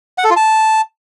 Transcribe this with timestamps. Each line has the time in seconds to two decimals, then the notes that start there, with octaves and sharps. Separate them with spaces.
0.18 F#5
0.24 A4
0.30 F4
0.36 A5